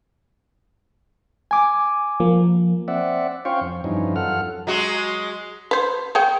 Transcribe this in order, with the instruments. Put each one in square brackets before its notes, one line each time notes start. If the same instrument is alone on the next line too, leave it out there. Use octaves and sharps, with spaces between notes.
[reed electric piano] G#5 D6
[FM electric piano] F3 A#3
[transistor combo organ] C4 D5 E5 F#5
C#4 F4 C5 F5 G5 C#6
F2
G2 E3 F3 C#4 D#4
F#2 F4 A4 F#5 F6
[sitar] F#3 G#3 F#4
[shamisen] B4 C5
G#4 C#5 G5